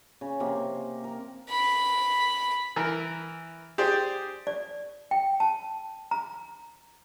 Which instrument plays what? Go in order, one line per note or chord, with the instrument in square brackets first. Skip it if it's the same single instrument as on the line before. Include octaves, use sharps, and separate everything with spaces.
[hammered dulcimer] C#3
C3 A#3
A#4
[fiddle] B5
[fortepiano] E3 A#4
G4 G#4 C5 D5
[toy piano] D5
G5
A5
A#5